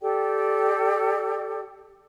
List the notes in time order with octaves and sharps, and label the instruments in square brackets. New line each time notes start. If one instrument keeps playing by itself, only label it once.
[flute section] G4 A4 D5 G5